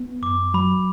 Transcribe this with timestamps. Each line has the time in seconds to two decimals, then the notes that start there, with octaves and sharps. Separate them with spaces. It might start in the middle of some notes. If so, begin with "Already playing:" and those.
Already playing: B3
0.22 F#2 D6
0.54 F#3 B5